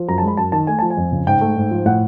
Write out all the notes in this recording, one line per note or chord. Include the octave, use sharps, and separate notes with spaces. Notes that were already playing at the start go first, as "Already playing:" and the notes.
Already playing: F3
F#2 A#5
G#3 A5
B5
F#2 A5
D#3 A5
A3 G#5
F3 A5
G#5
F2
C#3
G#2 G5
A3
G#2
F3
A2 F#5